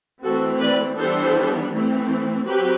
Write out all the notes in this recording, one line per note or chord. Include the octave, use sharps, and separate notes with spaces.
E3 A3 C4 F#4 A4
B4 D5
E3 G3 B3 D4 A4 C5
E3 A3 C4
F#3 C4 G4 B4